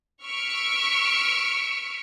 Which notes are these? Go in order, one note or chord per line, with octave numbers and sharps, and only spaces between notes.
C#6 E6 F6 B6 C#7 D7